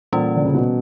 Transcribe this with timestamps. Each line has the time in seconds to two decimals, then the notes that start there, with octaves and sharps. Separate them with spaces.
0.13 A#2 E3 G3 C#4
0.36 D3
0.45 C#3
0.55 B2